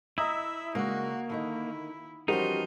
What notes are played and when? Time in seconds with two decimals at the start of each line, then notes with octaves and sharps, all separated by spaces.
0.18 E4 D#5 E5 A#5 D#6
0.75 C#3 G#3 A#3 D4 F#4
1.30 D3 D#3 D#4 E4
2.28 E3 F3 G3 C#4 D#4 F#4 A#4 C5